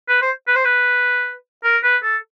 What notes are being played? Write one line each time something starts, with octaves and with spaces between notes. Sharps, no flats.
B4
C5
B4
C5
B4
A#4
B4
A4